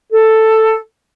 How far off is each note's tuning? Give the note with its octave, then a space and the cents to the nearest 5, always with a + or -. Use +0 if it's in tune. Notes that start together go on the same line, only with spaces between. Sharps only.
A4 +5